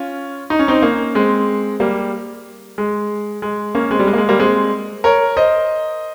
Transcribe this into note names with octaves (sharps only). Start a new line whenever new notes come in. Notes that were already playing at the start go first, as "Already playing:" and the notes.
Already playing: C#4 F4
D#4
C#4
C4 D#4
A#3 C#4
G#3 C4
G3 A#3
G#3
G#3
A#3 C#4
G#3 C4
G3
G#3
A#3
G#3
G3 A#3
G#3 C4
A#4 C#5
C5 D#5